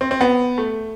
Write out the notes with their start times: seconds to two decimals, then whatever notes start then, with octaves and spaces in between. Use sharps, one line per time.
0.01 C4
0.11 C4
0.21 B3
0.58 A3